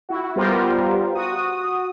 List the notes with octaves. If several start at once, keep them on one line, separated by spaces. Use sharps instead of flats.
E4 F#4
G3 B3 F4 G4 A#4 C5
F#4 D#6